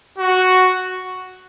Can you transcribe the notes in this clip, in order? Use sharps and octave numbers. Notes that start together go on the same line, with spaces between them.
F#4